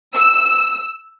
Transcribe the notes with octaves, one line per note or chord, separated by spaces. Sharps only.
E6